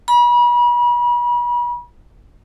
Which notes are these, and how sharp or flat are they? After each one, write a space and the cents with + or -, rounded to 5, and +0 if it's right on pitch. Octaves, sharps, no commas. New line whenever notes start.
B5 -40